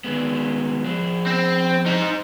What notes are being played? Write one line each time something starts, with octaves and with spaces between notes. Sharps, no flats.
D#3 G#3 B3
F3 G#4
C4
D#4 C5